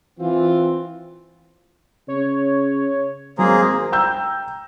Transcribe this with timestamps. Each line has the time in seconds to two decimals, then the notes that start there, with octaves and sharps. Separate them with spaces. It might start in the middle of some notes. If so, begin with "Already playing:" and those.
0.19 E3 C4 F4
2.08 C#3 C#5
3.39 G#1 F#3 A#3 G#4 C5 A#5
3.92 G5 A#5 E6 G6